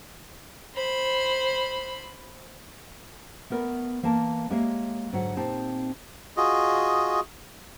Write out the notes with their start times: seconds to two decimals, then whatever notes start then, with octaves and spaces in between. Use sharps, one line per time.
0.74 C5 B5
3.50 A3 B3 A#4 B4
4.03 E3 A#3 A#4 A5
4.50 G#3 A#3 G4 C#5 E5
5.13 G#2 D3 F#3 F#4 C#5 F#5
5.36 A#2 C4 D#4 G4 A5
6.37 F4 F#4 G#4 D#5